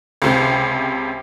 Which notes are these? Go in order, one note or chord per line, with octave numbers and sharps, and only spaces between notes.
C#2 C3